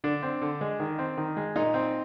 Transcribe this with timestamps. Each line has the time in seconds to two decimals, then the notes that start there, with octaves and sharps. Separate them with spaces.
0.04 D3 D4
0.23 C4
0.42 D3
0.61 G#3
0.80 D#3
0.99 C4
1.17 D#3
1.37 G#3
1.56 A#2 D#4
1.74 C4